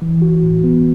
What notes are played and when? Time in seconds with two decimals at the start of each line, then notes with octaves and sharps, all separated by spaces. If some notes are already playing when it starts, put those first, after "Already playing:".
0.02 E3
0.22 F#4
0.43 A2
0.64 B3